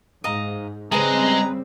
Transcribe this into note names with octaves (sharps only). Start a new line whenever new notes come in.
G#2 D#5 F5 A#5
C#3 G3 G#3 C4 G#4 B4 A#5